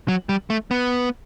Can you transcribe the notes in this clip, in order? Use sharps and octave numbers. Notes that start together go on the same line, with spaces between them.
F#3
G3
A3
B3